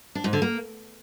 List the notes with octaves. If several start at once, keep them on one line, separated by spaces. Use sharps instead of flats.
D4
G#2
D3
A#3